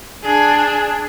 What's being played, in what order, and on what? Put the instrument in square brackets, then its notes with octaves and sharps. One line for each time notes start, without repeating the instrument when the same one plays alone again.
[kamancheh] D4 G#4